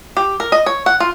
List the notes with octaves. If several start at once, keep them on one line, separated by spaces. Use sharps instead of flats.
G4
A#4
D#5
C#5
F#5
F4